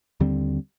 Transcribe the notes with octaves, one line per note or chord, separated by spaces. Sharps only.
D#2 D3 G3 C4